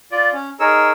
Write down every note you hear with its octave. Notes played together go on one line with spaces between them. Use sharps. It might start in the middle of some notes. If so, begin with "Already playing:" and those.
F4 D5
C#4
D#4 G#4 A#4 C#5 E6